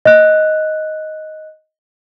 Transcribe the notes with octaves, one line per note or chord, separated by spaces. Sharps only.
D#5 F#6